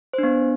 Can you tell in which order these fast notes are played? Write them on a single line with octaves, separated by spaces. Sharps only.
C5 D4 B3